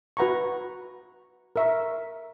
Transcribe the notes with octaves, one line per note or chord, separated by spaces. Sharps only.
F#4 B4 F#5 A#5 C#6
A#4 E5 A#5 C#6